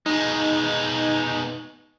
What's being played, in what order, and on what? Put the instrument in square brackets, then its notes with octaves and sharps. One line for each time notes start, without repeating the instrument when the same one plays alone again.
[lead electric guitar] B2 G#3 [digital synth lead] D#4